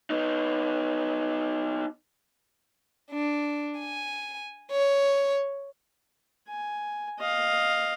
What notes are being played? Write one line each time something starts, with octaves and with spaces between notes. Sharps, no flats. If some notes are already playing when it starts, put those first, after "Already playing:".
B3 D#4
D4
G#5
C#5
G#5
D#5 F5